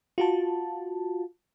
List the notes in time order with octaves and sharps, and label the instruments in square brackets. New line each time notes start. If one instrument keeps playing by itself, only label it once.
[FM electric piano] F4 F#4 A5